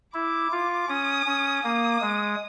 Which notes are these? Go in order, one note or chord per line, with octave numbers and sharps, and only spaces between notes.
E4 D6
F4
C#4 D#6
C#4
A#3 D#6
G#3